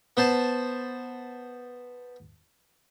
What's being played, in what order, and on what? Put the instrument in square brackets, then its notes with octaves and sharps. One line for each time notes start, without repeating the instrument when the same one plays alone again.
[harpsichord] B3 C5 A5